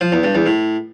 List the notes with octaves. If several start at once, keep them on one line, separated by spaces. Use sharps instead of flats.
F3
E2
G2
E2
A2